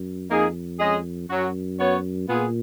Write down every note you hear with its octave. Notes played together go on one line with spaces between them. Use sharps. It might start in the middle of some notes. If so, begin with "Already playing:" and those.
Already playing: F#2
F2 A#3 D#4 G#4
G#3 C#4 G#4 D#5
F#2 F#3 C#4 F#4
B3 F#4 C#5
A#2 B3 F4 G#4